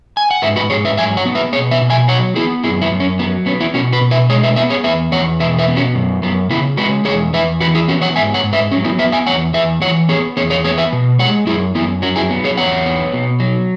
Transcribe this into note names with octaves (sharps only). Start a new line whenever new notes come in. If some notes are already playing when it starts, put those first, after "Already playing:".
G#5
F#5
G#2 B4 E5
F#4 B4
G#2 G#4 C#5
B4 E5
F#3 E5 G#5
C#5 F#5
B3
B4 E5
B2 G#4 C#5
B4 E5
B2
E5 G#5
F#3 C#5 F#5
B3 E4 G#4
F#2 E4 G#4
B3 E4
F#2
C#4
F#3 B3
B3 C#4
B3 E4
B2 C#4 F#4
F#4 B4
B2
B4 E5
G#3 G#4 C#5
B4 E5
B3 B4 E5
G#4 C#5
E2 B4 E5
E2 C#5 F#5
B2 B4 E5
B4 E5
B3
C#4 F#4
F#2
F#2 B3
C#3 B3 E4
G#3 F#4 B4
E2 G#4 C#5
E2 B4 E5
E3 F#4 B4
E4 G#4
B3 C#4 F#4
C#5 F#5
G#2 E5 G#5
C#5 F#5
G#2
B4 E5
F#3 C#4
B3 E4
B3 B4 E5
E5 G#5
E2 C#5 F#5
E2 B4 E5
E3 C#5 F#5
B3 G#4 C#5
E2 G#4 C#5
G#4 C#5
B3 G#4 C#5
B4 E5
B2
G#3 C#5 F#5
F#2 E4 G#4
F#2 B3 E4
F#3 C#4 F#4
E4 G#4
B3
G#4 C#5
E2 C#5 F#5
B3
B2
F#3